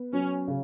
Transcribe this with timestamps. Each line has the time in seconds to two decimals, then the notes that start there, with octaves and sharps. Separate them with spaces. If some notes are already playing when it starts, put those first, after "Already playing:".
Already playing: B3
0.13 F#3 C#4
0.48 C#3